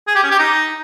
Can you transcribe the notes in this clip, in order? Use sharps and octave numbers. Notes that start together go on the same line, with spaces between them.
G#4
G4
C#4
G4
D#4